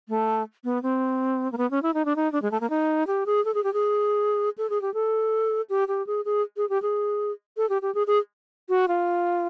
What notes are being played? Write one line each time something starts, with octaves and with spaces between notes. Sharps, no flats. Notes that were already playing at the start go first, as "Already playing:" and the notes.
A3
B3
C4
A#3
B3
C#4
E4
D#4
D4
D#4
D4
G#3
A3
A#3
D#4
G4
G#4
A4
G#4
G4
G#4
A4
G#4
G4
A4
G4
G4
G#4
G#4
G#4
G4
G#4
A4
G4
G4
G#4
G#4
F#4
F4